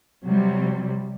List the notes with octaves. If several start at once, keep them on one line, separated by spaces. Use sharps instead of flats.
C3 F#3 G3